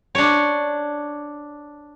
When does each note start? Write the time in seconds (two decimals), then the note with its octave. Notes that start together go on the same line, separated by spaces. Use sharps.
0.15 D4 C#5